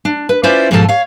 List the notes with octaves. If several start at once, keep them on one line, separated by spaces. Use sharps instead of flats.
D4
B4
C#4 E4 F4 B4 C5 D5
G#2 B2 F3 F4 A4 A5
C#5 F5